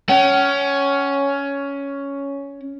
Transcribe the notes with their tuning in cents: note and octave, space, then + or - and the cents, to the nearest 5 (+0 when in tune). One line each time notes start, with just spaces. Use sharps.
C#4 +10 F#5 +45